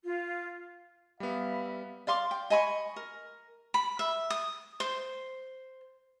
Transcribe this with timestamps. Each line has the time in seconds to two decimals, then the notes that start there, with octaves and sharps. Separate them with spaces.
0.03 F4
1.20 G3 B3 E5 F5 B5
2.07 D5 F5 C6 D6
2.31 G5
2.50 D#5 G#5 B5 C#6
2.96 A#4
3.74 B5
3.99 E5
4.30 D#6
4.80 C5